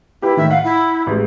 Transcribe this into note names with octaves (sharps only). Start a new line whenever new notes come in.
E4 G4 B4
A2 D#3 E5
F5 F#5
E4
A1 G#3